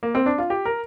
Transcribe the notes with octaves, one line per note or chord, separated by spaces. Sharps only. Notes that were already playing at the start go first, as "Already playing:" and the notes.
A#3
C4
D4
F4
G4
A#4